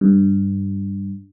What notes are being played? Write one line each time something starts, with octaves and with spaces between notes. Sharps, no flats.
G2